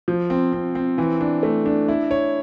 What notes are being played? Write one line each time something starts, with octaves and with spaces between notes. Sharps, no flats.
F3
C4
C4
C4
E3
D4
A3
D4
E4
C#5